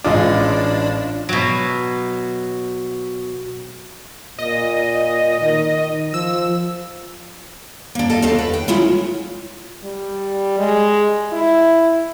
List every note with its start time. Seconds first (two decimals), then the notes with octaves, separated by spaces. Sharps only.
0.04 A1 G#3 D4 F4 D#5 F5 D6
1.29 B2 F#3
4.39 A#2 D#5
5.41 D#3
6.14 F3 E6
7.95 A#3 D4
8.10 A4 D#5 F5 A5
8.22 E2 D4 A4 D#5 F5 A5
8.39 B4
8.54 G5
8.68 F#3 G#3 C#4 E4 F4
9.84 G3
10.58 G#3
11.32 E4